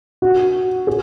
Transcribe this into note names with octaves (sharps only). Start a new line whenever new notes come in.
F#4
G#4